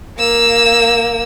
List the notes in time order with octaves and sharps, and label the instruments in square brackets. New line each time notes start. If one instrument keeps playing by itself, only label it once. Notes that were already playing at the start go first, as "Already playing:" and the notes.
[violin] A#3 E6